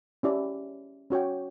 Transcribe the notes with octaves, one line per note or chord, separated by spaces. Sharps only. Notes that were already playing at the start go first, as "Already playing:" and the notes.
C#4 E4 G4 D5
C#4 F#4 C#5 G5